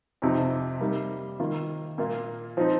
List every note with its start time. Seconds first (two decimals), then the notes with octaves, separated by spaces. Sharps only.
0.22 F2 C3 F3 D#4
0.80 G3 A#3 D#4
1.40 D#3 A#3 F4
1.98 A#2 A#3 F4
2.57 F3 C4 D#4